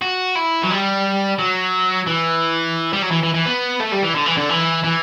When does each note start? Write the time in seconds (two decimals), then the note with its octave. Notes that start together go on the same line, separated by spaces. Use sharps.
0.02 F#4
0.36 E4
0.63 F#3
0.70 G3
1.39 F#3
2.07 E3
2.93 G3
3.02 F#3
3.11 E3
3.23 E3
3.34 E3
3.46 B3
3.80 A3
3.92 G3
4.03 E3
4.15 D3
4.26 E3
4.37 D3
4.49 E3
4.84 E3